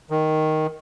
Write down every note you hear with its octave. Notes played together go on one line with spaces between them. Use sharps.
D#3